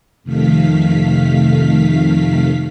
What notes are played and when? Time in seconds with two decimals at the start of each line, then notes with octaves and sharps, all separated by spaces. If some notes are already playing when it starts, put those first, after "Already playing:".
0.23 F2 C3 D#3 A3 F5 B6